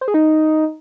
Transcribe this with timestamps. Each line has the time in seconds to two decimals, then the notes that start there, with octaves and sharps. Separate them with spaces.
0.01 C5
0.08 G#4
0.14 D#4